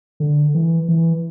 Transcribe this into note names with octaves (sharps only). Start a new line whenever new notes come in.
D3
E3
E3